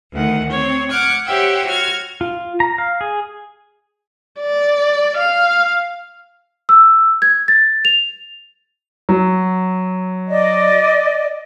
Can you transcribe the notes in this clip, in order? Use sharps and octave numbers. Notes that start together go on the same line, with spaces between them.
D2 D#3 F#5
C4 C#5
F#5 D6 F6 F#6 G#6
G4 C5 C#5 E5 F#5 G5
F#4 F6 G#6
F4
A#5
F5
G#4
D5
F5
E6
G#6
A6
F7
F#3
D5 D#5